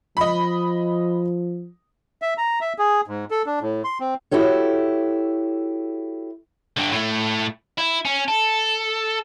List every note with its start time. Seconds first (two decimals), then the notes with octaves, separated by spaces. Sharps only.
0.17 F3 D#5 B5
2.22 E5
2.38 A#5
2.61 E5
2.78 G#4
3.07 G#2
3.31 A4
3.46 D4
3.61 A2
3.84 C6
4.00 C4
4.31 E4 F#4 G4 A4 C#5
6.77 G2 D3
6.92 A2 A3
7.78 E4
8.05 C#4
8.28 A4